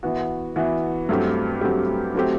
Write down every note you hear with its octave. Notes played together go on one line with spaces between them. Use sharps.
E3 B3 F#4
E3 B3 F#4
G2 F#3 A3 C4 G4
G2 F#3 A3 C4 G4
F#3 A3 C4 G4